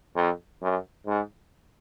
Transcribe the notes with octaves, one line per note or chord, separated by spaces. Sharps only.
F2
F#2
G#2